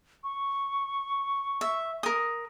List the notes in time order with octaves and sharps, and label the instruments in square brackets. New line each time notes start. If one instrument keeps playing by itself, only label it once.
[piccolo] C#6
[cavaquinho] E5
A#4 D#6